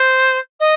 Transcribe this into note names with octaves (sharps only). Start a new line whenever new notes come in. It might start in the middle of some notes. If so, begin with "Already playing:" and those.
Already playing: C5
D#5